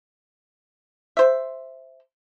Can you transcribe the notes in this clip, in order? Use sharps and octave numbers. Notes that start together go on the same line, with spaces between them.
C5 E5